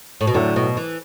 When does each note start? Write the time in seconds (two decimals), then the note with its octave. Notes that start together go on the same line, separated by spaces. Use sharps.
0.21 A2
0.27 B2
0.34 A2 D3 F#3 A3
0.56 B2
0.77 E3